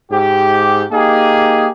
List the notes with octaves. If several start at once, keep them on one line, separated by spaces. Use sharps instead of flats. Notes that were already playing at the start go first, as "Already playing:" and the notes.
G#2 G4
A#3 D#4 G4 G#4